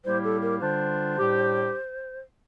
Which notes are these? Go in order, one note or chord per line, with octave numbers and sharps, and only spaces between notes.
A2 G3 A#3 E4 G4 C5
A4
A#4
D3 G3 D4 F4 C5
A2 G3 D4 G4